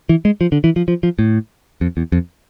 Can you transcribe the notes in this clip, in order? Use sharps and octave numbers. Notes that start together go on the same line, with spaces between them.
E3
G#3
F3
D3
E3
F3
F3
F3
A2
F2
E2
F2